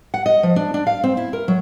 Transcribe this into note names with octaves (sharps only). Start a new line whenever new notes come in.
F#5
D#5
F3
D4
D4
F5
C4
E4
A#4
F#3